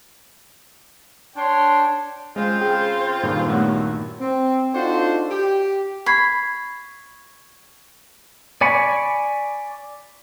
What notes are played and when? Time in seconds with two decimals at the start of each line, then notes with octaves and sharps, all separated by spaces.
1.36 D4 C#5 G5 C6
2.36 C#3 G#3 C4 F4 C5
2.61 G#4 G5
3.23 G2 A#2 D#3
3.48 D#2 F#3 A3 B3
4.20 C4
4.74 D4 D#4 F4 F#4 A4 C5
5.30 G4
6.06 B5 C#6 G#6 C7
8.61 D5 G#5 B5 C#6